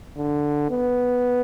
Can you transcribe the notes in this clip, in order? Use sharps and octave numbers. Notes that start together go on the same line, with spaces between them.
D3
B3